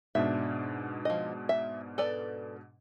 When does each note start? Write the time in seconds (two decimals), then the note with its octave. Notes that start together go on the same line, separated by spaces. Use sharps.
0.15 G#2 B2 D4 E5
1.05 F3 D#5
1.49 E5
1.98 A4 B4 D5